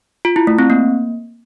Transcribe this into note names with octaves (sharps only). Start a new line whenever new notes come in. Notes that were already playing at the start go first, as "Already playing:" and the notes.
F4
E4
A3
C4
A#3